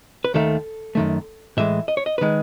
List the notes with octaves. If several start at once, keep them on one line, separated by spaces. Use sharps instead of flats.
B4
D#2 D#3 A3 A4
F#2 D#3 A3
A2 E3 G#3 E5
D#5
C#5
D#5
D#3 G#3 B4